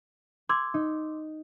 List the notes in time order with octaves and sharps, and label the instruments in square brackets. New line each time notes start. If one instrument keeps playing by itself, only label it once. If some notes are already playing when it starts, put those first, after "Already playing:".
[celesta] C6 D6 E6 [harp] G#6
[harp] D#4